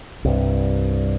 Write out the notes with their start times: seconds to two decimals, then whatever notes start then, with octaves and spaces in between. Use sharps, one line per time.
0.24 C2 G2